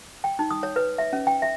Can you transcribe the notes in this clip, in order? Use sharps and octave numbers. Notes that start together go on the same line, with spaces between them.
G5
D#4
D#6
C#5
B4
E5
C#4
G5
E5